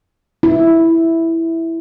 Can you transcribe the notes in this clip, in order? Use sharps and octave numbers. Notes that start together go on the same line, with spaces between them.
E4